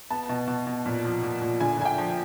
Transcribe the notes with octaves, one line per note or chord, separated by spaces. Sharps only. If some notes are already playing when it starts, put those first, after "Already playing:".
B3 A5
B2
B2
B2
A#2
F3
A#2
A#2
D3 G#5
D3 G#5
G5
F3